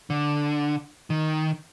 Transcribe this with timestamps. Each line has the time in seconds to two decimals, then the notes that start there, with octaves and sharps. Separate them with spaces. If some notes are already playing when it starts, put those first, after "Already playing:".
0.10 D3
1.10 D#3